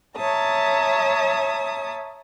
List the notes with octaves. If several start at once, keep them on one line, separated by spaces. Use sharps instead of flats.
C#5 E5 A5 A#5 D#6